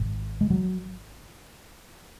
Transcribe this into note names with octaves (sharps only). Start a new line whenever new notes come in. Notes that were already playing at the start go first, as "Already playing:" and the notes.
Already playing: G#1 G#2
G#3
F#3